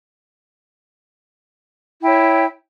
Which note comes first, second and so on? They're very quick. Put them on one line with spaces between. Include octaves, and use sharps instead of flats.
E4 G5 C#5